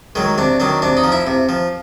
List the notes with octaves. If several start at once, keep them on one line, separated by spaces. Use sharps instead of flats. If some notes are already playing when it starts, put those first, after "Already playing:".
D#3 F#3 G#3
C3 D4
D#3 F#3 D4
C3 D4
D#4
F3
E4
C3
F3